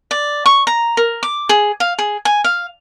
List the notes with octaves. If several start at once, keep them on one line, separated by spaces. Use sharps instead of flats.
D5
C#6
A#5
A#4
D6
G#4
F5
G#4
G#5
F5